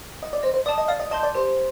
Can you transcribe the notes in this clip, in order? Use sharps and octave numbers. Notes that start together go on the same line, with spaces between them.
D#5
D5
C5 D#5
C5
D5 A5 D#6
D#5
D5 F5
D#5
D#5 A5 C6 G6
D5
G4 C5